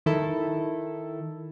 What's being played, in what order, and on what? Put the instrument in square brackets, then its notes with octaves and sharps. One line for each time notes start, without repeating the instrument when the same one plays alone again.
[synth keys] D#3 E4 A4